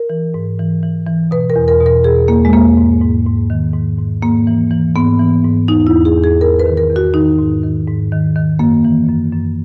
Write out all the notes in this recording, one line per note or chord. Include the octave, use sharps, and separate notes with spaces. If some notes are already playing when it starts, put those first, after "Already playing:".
Already playing: A#4
E3
G#2
E3
E3
E3
B2 B4
A#4
E2
A#4
B2
A#4
E2 G#4
E2 A#3
G#3
E2 A#3
G#2
G#2
G#2
D#3
G#2
G#2
G#2 A#3
E3
E3
G#2 B3
E3
G#2
E2 D#4
E4
E2
G#4
E2
G#4
E2 A#4
B4
D#3
A#4
E2
F#4
D#3 D#4
G#2
D#3
G#2
D#3
D#3
F#2 A#3
E3
F#2
F#2